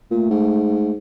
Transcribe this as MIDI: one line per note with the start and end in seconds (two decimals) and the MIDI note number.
0.11 0.27 46
0.11 0.91 57
0.30 0.97 44